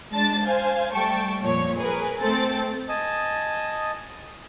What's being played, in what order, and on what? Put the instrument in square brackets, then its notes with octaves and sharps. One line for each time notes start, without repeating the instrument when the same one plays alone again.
[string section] G#3 D4 A5 A6
C5 F5 G#5
G3 A3 G5 A5 C#6
F2 A#2 C#5
G#4 A#4 B4
A3 C4 A4 A6
[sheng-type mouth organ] D#5 G#5 A5